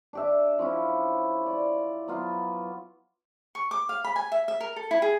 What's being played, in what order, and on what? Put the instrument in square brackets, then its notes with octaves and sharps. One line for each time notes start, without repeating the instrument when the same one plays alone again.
[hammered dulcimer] D4 G4 E5
F3 C#4 E4
D5
F#3 B3 F4
[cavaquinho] C#6
D6
F5
B5
G#5
E5
E5
A#4
A4
E4
G#4